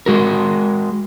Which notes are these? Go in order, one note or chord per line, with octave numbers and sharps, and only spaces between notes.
G#3 F#4 A#4